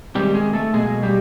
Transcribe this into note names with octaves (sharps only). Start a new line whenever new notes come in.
C3 D#3 G3 G#3 G4
G#3 G#4
A3 A4
B2 F#3 G#3 A#3 G#4
G3 G4